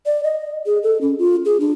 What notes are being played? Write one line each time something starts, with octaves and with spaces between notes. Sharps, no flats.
D5
D#5
G#4
A4
C#4
F4
G#4
D4